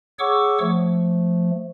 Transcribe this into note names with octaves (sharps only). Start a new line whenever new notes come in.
G#4 C#5 F#5 C#6 D6 E6
F3 A3